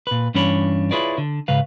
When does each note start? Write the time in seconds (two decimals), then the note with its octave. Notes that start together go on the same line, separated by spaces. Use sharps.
0.07 A#2 B4
0.34 G2 E3 C#4 D4 C#5 B5
0.91 E4 F4 G#4 B4 C#5 D5
1.18 D3
1.48 G#2 C#3 B4 F5